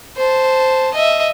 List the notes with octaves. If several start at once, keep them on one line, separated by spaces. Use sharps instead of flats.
C5 A5
D#5 E5